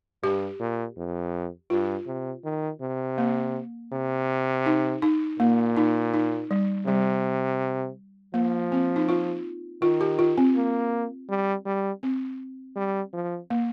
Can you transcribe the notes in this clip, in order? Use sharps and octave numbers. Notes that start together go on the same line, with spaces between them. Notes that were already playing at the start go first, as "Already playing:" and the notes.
G2 G4
A#2
F2
G2 F4
C3
D#3
C3
A#3
C3
D#4
D#4
A#2 A#3
D#4
D#4
G3
C3 G3
F3 A#3
C4
D#4
F4
D#3 F4
G4
F4
C4
A#3
G3
G3
C4
G3
F3
A#3